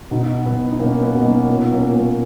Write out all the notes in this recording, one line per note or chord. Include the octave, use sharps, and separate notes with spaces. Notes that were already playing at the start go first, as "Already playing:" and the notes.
B2 D#4 F#4
B2 B3
D#4
B2 A#3 C#4
B3 D#4
B2
A#3 C#4
A#2 B3
A#3 C#4
A#2
A#3